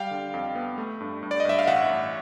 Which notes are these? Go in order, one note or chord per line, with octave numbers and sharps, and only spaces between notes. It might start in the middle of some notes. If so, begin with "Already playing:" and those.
Already playing: G3 F5 G5
D3
F2
B3
A3
G2
G2
D5
D#5
G2 E5
F5
A1 E5 F#5
A1